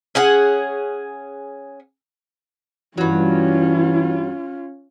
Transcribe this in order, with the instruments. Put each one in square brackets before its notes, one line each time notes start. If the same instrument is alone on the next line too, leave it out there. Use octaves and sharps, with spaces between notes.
[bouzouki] C#4 G#4 F#5
[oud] G2 F#3 [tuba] E3 [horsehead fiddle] C#4 F4